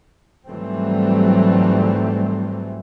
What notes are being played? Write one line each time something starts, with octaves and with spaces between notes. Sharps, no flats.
G#2 E3 F#3 G3 A3 C4